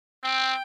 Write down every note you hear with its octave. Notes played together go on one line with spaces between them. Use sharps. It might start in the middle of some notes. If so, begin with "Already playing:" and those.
C4 G5